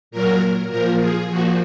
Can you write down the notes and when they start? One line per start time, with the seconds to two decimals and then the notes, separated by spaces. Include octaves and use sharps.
0.11 A#2 F#3 A#4
0.70 A#2 F3 A#4
0.99 G#4
1.28 A#2 F3 F#4